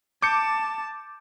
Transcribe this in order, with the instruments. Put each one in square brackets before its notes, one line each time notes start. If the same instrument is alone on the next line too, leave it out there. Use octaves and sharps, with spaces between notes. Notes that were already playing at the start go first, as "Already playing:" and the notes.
[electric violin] A5 [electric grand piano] D6 G6 C#7